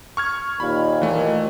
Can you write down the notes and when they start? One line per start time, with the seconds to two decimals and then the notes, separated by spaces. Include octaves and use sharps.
0.17 C#6 F6 G#6
0.60 D#2 A#2 B5
1.02 E3 A3